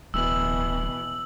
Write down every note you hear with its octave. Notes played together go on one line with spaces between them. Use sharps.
D1 B2 E3 E6 F#7